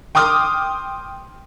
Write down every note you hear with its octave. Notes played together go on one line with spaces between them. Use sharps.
G5 C6 D6 D#6 F6